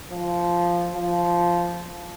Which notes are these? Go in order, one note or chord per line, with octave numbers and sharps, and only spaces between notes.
F3
F3